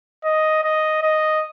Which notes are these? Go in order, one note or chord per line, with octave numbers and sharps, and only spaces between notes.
D#5
D#5
D#5